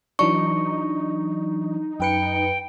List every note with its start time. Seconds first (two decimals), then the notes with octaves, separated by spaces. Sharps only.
0.19 E3 F#3 D4 D#4 C#6
2.00 F#2 B4 G5 C#7